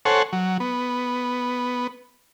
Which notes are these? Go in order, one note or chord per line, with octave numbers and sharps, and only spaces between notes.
A4 C5 C#5 F#5 G#5
F#3
B3